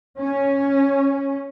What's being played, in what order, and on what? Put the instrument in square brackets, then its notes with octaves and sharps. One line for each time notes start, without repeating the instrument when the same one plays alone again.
[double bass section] C#4